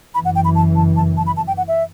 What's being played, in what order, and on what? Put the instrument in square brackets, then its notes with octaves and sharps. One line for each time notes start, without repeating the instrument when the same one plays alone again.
[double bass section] F#1 F#2 E3 [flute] B5
[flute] F#5
G5
B5
A5
A5
A5
A5
B5
A5
G5
F#5
E5